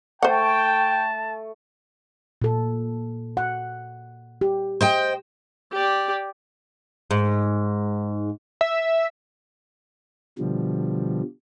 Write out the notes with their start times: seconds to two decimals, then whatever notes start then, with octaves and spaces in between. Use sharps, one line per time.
0.23 A3 C5 F#5 G5 A5
2.42 A#2 A4
3.37 F#5
4.41 G4
4.81 C5 D#5 G5
5.72 G4 D5
7.11 G#2
8.61 E5
10.39 B2 D3 F3 G3